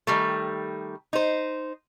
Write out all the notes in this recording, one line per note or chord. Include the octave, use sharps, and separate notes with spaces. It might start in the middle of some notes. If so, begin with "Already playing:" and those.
D#3 G3 A3
D#4 C5